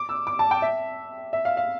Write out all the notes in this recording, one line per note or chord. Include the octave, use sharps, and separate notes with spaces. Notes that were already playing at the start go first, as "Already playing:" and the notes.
Already playing: D6
E6
D6
A5
G5
E5
E5
F5
F5